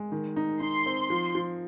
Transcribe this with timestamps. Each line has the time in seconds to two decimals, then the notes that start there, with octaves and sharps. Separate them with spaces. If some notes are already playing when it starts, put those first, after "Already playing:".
Already playing: G#3
0.12 D#3
0.36 D#4
0.61 D#4 C6
0.86 C4
1.10 F3
1.35 F3